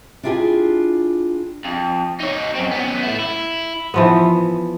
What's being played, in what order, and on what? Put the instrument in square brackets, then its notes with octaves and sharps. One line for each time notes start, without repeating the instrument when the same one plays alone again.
[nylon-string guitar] D4 E4 F4 G4 G#4
[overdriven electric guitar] F2
D#4 C#5
F#2 C4
B3 C#4
A3 E4
E4
[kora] E3 F3 B3